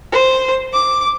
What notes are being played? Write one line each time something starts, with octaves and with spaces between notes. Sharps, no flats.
C5
D6